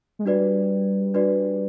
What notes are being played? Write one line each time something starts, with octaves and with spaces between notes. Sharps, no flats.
G#3
G3 D4 F#4 B4 D5
D4 F#4 B4 D5